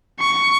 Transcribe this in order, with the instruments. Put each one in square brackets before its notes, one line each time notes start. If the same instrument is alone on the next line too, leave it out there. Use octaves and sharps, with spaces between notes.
[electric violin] C#6